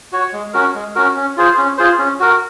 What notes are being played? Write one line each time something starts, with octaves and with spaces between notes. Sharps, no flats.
F#4 C#5
G#3
C#4 F#4 A#4
G#3
C#4 F#4 A#4
C#4
F4 G#4 C5
C#4
F4 G#4 C5
C#4
F#4 A#4